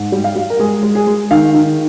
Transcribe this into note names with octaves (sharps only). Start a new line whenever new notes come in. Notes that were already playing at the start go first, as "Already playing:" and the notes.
Already playing: G#2
G3
F5
G3
A#4
G#3 G#4
G#3
G#4
G#3
D#3 F5
D#3